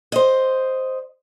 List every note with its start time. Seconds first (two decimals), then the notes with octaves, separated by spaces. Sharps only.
0.12 C5 D#5